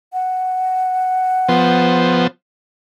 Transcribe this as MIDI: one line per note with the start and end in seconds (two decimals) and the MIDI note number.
0.13 2.25 78
1.49 2.27 53
1.49 2.27 59
1.49 2.27 72